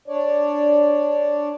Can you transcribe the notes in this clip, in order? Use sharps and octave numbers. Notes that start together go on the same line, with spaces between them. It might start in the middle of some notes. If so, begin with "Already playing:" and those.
D4 C#5 D5